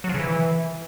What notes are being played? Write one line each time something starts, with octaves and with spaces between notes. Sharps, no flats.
F#3
F3
C#3
E3